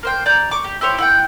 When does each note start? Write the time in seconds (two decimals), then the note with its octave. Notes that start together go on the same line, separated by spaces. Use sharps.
0.03 A#3 C5 G5
0.26 D5 A#5 G6
0.51 C#6 D6
0.64 G4
0.81 E4 G4 C5 C#5
0.98 E4 F#5 G5